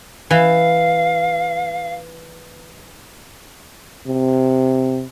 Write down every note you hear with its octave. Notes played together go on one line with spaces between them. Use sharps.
E3 F5
C3